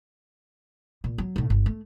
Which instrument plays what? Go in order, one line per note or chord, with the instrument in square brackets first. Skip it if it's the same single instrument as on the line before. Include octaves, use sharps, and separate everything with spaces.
[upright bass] A#2
F#3
B1 A2
G1
A3